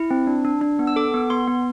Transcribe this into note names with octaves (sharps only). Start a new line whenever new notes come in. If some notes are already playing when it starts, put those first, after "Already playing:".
Already playing: E4
C4
D4
D4
D4
B3
E6
A4 D6
B3
B3 C6
B3